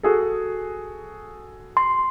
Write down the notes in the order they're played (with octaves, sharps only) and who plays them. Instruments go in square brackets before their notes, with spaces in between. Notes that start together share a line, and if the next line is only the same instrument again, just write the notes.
[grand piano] F#4 G#4 A4
[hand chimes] C6